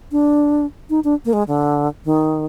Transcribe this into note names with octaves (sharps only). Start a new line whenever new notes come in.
D4
D#4
D4
A#3
G#3
D3
D#3